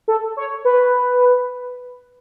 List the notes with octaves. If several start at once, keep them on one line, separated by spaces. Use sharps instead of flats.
A4
C#5
B4